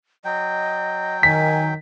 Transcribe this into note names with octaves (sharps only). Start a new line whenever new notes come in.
F#3 D#5 G5
D#3 G#5 B6